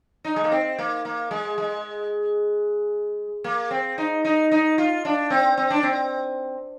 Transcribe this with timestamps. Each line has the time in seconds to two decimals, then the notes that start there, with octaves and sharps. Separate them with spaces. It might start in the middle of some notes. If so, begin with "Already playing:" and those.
0.25 D#4
0.36 G#3
0.44 A#3
0.51 C4
0.79 A#3
1.05 A#3
1.31 G#3
1.58 G#3
3.44 A#3
3.71 C4
3.98 D#4
4.25 D#4
4.51 D#4
4.78 F4
5.05 D4
5.30 C4
5.58 C4
5.70 D4
5.83 C4